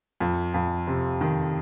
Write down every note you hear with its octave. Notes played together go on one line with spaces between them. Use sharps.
F2
F2
C3
D#3